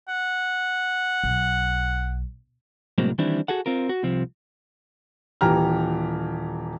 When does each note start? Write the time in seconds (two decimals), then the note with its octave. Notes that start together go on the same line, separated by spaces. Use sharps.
0.08 F#5
1.23 B1
2.98 C2 A2 F#3 G#3 A#3 C4
3.18 D#3 E3 G3 C4 D4 E4
3.48 F#4 G#4 A4 F#5
3.66 C4 F4 A#4
3.89 F#4
4.03 C2 C3 F3 C4
5.41 D#1 E3 G4 A#5 F6